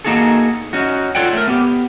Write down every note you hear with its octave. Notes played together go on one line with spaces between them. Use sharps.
A#3 D#4 F#4 G#4 A4
C#4 D#4 F#4
F4 A4 C#5 D5 F#5 G5
A3 A#4
B3 G4